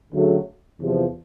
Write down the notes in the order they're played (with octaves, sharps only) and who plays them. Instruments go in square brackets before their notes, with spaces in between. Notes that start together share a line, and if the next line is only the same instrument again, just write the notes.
[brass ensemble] D2 C#3 F#3 A3
E2 C3 F3